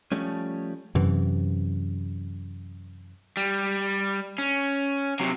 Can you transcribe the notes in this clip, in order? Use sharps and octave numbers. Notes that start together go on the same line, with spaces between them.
F3 G3 A3 C#4
F#2 C3 E3
G3
C#4
C3 F#3